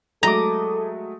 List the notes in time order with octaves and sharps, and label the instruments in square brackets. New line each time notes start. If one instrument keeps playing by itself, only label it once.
[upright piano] F#3 G#3 A3 [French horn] A4 [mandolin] D#5 D6 [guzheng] A#5